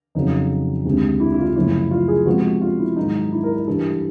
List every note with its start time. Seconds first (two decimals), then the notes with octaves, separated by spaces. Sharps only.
0.15 F2 C#3 F#3 D#4
0.85 D2 C3 D#3 G#3
1.20 E4
1.32 E4
1.39 F4
1.44 E4
1.56 F#2 C#3 F3 A3 E4
1.91 F4
2.08 G#4
2.26 C3 F3 G#3 B3 F#4
2.61 F4
2.79 E4
2.96 G#2 D#3 F#3 D#4
3.32 E4
3.43 A#4
3.56 A#4
3.67 G2 E3 G3 A4